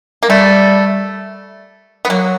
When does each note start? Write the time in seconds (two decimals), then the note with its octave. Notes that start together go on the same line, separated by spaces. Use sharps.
0.23 A#3
0.29 G3 A3
2.05 B3
2.09 F#3 A#3